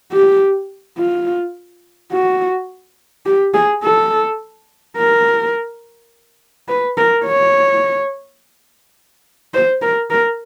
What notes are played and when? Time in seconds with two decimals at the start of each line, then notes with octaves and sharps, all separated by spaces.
0.12 G4
0.98 F4
2.12 F#4
3.25 G4
3.54 G#4
3.83 A4
4.97 A#4
6.68 B4
6.97 A#4
7.25 C#5
9.54 C5
9.82 A#4
10.10 A#4